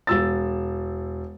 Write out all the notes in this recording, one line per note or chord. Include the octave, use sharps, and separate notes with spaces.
E1 E6 A6